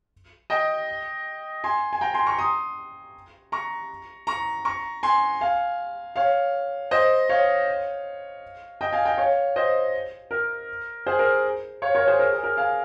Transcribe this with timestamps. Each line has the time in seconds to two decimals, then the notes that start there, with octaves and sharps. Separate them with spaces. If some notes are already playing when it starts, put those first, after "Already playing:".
0.50 D#5 G5
1.64 G#5 C6
1.93 G#5
2.01 G5 A#5
2.14 G#5 C6
2.26 A#5 C#6
2.39 C6 D#6
3.52 A#5 C#6
4.27 A#5 C#6
4.65 A#5 C#6
5.03 G#5 C6
5.41 F5 G#5
6.16 C#5 F5
6.91 C5 D#5
7.29 C#5 F5
8.81 D#5 G5
8.93 F5 G#5
9.05 D#5 G5
9.18 C#5 F5
9.56 C5 D#5
10.31 A#4
11.06 G#4 C5
11.19 A#4
11.82 C#5 F5
11.95 A#4 C#5
12.07 G#4 C5
12.19 A#4
12.32 G#4
12.44 A#4
12.57 F5 G#5